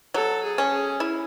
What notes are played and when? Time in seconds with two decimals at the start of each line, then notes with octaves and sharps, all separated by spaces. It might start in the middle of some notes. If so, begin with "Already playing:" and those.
0.14 F#3 A4
0.43 G#4
0.58 C#4
0.72 G#4
1.00 E4